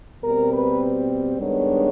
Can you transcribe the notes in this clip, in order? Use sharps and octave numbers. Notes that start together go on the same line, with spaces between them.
B2 G3 C4 A#4
B4
G2 D#3 G#3 B3 D4 C#5